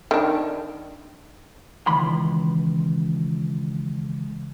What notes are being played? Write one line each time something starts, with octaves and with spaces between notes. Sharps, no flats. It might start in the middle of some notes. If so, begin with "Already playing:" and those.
D#3 D4
C#2 D#3 E3 B5 C6